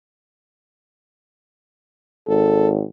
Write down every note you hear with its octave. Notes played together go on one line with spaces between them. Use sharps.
G#1 A4